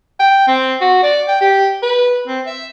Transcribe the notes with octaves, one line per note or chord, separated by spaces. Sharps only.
G5
C4
F#4
D5
G5
G4
B4
C4
E5